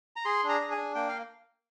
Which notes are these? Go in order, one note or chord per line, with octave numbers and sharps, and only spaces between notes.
A#5
G#4 C6
D4
A#5
G#4
G#5
D4
A#3 G5
F5